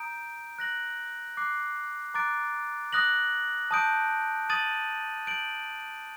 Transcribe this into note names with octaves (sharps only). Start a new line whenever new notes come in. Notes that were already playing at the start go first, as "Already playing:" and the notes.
Already playing: A#5 D#6 G6 D7
F#6 A#6 F#7
D6 F#6 C7
A#5 D6 F#6 A6 D7
D#6 F#6 A#6 F#7
A5 D#6 G6 D7
D#6 A6 D#7 F#7
G6 D7 F#7